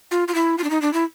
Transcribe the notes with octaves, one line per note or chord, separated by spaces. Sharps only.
F4
F4
E4
F4
D4
D#4
D4
E4